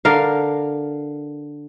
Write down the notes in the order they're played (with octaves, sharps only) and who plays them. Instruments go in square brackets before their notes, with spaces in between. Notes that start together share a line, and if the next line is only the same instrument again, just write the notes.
[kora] D3 A#4 F5